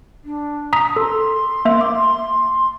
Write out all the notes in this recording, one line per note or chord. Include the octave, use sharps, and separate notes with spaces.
D4
A#5 D#6 B6
A4 C6
A#3 E5
D6